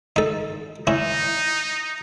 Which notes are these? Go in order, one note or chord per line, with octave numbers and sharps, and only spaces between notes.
D#4 A4
C#4 D#4 E4